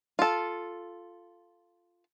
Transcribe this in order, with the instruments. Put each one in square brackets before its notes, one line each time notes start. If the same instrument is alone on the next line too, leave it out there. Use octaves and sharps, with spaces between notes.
[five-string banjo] F4 A4